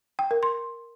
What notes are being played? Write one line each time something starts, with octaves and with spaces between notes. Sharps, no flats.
G5
A#4
C6